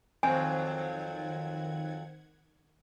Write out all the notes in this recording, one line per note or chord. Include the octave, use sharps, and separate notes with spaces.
F2 D#3 F#3 C4 F#5 G#5 G#6